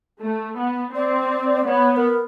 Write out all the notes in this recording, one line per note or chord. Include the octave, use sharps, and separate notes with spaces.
A3
B3
C4 D5
B3 C#5
C#5
A#4